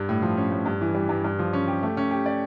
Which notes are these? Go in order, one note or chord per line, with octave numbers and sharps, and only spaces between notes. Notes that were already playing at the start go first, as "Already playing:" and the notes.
Already playing: G2
A2
F3
C#4
A2
G2
E3
G3
G2
G2
F3
C#4
G4
A3
C#4
G4
D5